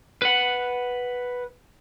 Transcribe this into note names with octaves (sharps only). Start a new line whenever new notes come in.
B4 F#5